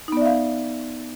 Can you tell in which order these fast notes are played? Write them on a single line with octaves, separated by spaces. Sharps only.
D#4 B3 D5 E5 F5